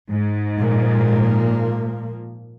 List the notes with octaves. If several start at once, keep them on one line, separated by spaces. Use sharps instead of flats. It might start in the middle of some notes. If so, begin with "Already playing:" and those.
G#2
A#2 F3 A#3